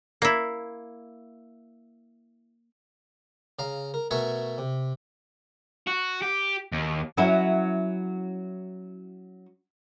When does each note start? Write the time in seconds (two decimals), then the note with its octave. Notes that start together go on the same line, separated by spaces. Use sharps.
0.22 A#3 E4
3.59 C#3 F5 A#5
3.94 A#4
4.11 B2 A3 A#4 E5 G#5 C#6
4.58 C3
5.87 F#4
6.22 G4
6.72 D#2
7.17 F#3 C#4 E4